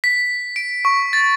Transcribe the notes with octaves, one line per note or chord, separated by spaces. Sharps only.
B6
D7
C#6
A6